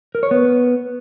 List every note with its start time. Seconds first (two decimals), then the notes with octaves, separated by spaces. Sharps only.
0.15 A#4
0.23 C#5
0.31 B3